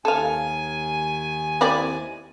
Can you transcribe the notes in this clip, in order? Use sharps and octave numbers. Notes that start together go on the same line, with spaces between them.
D#2 A4 F5 G#5
C4 E4 D5